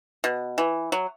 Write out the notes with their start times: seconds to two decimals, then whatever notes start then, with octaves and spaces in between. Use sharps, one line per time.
0.24 B2
0.58 E3
0.92 F#3